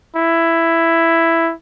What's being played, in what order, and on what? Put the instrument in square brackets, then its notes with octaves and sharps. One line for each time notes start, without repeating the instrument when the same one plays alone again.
[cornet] E4